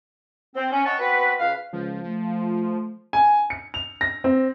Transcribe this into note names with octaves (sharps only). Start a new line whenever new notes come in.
C4
C#4
C#5 D#5 F#5 G5 A5 C#6
B3 C4 F#4 B4
C#2 B4 F5
C#2 F3
A3
G#5
C#7
F7
A#6
C4